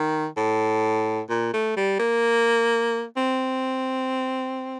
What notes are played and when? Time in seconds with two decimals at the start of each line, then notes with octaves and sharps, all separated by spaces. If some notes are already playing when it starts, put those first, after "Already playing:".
Already playing: D#3
0.37 A2
1.30 A#2
1.54 A3
1.77 G3
1.99 A#3
3.17 C4